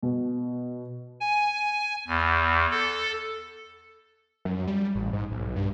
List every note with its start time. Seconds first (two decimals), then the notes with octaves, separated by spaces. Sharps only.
0.03 B2
1.20 G#5
2.07 E2
2.71 A4
4.45 F#2
4.67 G3
4.95 A1
5.13 G#2
5.32 B1
5.56 G2